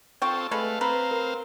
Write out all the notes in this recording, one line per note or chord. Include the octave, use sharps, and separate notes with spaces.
C4 F4 A4 G5 C#6
G#3 A3 A4 B4 F5
C4 B4 F5 A#5
A#4